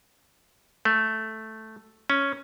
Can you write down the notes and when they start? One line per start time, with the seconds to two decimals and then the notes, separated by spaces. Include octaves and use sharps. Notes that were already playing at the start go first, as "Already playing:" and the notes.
0.85 A3
2.10 C#4